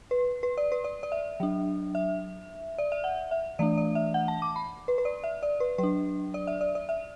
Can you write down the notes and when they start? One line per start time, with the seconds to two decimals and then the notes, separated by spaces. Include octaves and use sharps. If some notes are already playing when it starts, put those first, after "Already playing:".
0.11 B4
0.43 B4
0.57 D5
0.72 B4
0.84 D5
1.03 D5
1.12 E5
1.40 F#3 D4
1.95 E5
2.78 D5
2.92 E5
3.04 F#5
3.31 E5
3.59 E3 A3 D4 D5
3.78 D5
3.95 E5
4.14 F#5
4.28 A5
4.42 D6
4.56 B5
4.88 B4
4.98 B4
5.05 D5
5.24 E5
5.43 D5
5.60 B4
5.78 F#3 B4
5.83 D4
6.34 D5
6.47 E5
6.61 D5
6.75 D5
6.89 E5